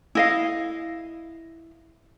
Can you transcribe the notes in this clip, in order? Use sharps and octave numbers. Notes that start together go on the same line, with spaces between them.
E4 D#5 F5